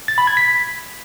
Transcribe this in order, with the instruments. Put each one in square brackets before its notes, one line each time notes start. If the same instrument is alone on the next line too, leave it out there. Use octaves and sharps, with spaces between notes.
[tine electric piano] A6
B5
G#6
B6